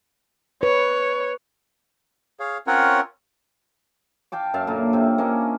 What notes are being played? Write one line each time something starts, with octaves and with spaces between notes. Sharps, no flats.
B4 C#5
G#4 C#5 F5
C4 C#4 F4 A#4 C#5 F#5
F5 G5 A5 D6
F#2 E5 F5 A5
A#2 D3 A#3
C3 C4
A#3 C#4 D4 D#5